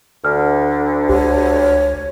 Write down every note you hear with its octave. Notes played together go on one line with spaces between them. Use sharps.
D2 D3 F6
C#2 G4 C#5